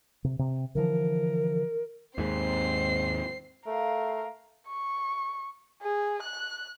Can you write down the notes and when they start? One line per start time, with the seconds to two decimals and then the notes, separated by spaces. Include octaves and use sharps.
0.24 C3
0.39 C3
0.75 D3 E3 F3 A#4
2.18 D#2 G#2 C4 C7
3.66 A3 A#4 F5
4.68 C#6
5.82 G#4
6.22 F#6